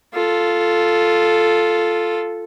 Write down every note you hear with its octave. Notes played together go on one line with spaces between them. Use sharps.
F4 A4